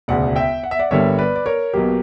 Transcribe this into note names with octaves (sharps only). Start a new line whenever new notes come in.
E1 D2 C#3 D5 F#5
E5 G5
F#5
E5
D5 F#5
G1 G2 D3 G3 A#3 C#5 E5
B4 D5
D5
A#4 C#5
B1 B2 F#3 A#3 G4